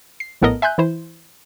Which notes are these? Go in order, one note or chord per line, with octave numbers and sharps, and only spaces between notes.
C7
A#1 A2 B3 A4 A#4 D#5
E5 G#5 C6 F#6 G6
E3 E4 C5